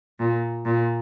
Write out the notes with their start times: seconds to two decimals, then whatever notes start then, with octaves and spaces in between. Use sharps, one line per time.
0.19 A#2
0.65 A#2